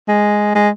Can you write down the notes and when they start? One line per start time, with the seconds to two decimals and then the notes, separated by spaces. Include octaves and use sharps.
0.08 G#3
0.55 G#3